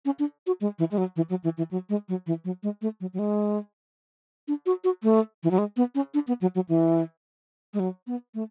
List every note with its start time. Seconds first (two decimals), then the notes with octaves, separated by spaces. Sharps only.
0.05 C#4
0.19 D4
0.47 F#4
0.61 G#3
0.79 E3
0.91 G#3
0.98 F#3
1.16 E3
1.30 F#3
1.44 E3
1.58 E3
1.71 F#3
1.89 G#3
2.09 F#3
2.27 E3
2.45 F#3
2.63 G#3
2.82 A3
3.01 F#3
3.13 F#3
3.19 G#3
4.48 D4
4.66 F#4
4.84 F#4
5.03 A3
5.43 E3
5.51 F#3
5.58 G#3
5.77 B3
5.95 C#4
6.14 D4
6.28 B3
6.41 F#3
6.55 F#3
6.69 E3
7.74 G#3
7.80 F#3
8.07 B3
8.34 A3